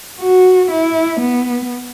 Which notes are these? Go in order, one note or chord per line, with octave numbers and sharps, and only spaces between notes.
F#4
E4
B3